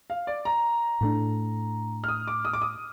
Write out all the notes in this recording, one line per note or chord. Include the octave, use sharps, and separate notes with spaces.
F5
D5
A#5
A2 A3 D4
F6
D#6
D6
D#6
D6
D#6